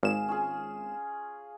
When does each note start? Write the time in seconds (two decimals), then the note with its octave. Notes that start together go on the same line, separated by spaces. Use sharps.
0.03 G#1 G#4 F5 E7
0.28 C#4 F4 G#4